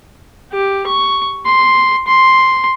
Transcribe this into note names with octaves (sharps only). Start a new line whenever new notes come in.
G4
C#6
C6
C6